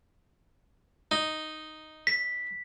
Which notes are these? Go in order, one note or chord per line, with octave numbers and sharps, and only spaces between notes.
D#4
B6